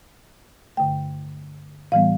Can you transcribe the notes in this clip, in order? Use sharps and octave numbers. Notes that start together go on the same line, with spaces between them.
G2 D3 A3 G5
A2 E3 G3 B3 F5